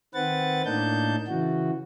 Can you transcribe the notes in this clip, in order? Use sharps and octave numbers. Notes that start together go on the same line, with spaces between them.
D#3 C4 B4 F#5 A6
A2 A#3 D4 D#4 A5 G6
C#3 E3 F#4